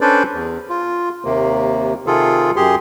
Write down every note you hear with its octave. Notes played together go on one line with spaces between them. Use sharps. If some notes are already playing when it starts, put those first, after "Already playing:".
C#4 D4 A4 B4 C5 D5
E2
F4
D#2 C3 A#3
C3 D#3 F4 G#4 A4
F#2 G4 G#4 C6